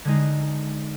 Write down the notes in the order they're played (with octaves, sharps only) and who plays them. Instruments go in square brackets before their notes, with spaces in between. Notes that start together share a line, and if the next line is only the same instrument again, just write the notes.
[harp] D3 G#3 D#4